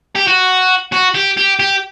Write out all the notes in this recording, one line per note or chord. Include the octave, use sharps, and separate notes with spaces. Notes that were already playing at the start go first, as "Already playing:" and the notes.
G4
F#4
F#4
G4
G4
G4